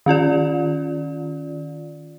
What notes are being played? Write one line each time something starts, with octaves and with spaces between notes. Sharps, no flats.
D#3 C#4 F4 D5